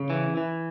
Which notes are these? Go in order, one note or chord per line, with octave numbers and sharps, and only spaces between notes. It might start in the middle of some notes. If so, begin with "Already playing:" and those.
Already playing: C#3
E3
E3